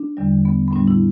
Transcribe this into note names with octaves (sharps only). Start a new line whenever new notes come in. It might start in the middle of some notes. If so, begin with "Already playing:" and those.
Already playing: D4
E2 D3 G3
B3
B3
A2 G3 D4
E4